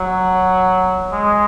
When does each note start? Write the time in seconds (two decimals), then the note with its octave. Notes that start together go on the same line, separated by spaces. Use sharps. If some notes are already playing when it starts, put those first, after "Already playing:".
Already playing: F#3
1.12 G#3